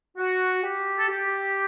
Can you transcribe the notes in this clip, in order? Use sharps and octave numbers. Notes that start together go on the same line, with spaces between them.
F#4
G4
A4
G4